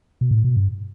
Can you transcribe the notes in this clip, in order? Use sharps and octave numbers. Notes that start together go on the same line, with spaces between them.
B2
A2
B2
G2